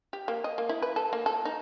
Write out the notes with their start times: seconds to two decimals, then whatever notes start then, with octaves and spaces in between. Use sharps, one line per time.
0.13 G4
0.28 A#3
0.44 D#5
0.58 A#3
0.69 E4
0.82 B4
0.96 A4
1.13 A#3
1.26 A4
1.45 D#4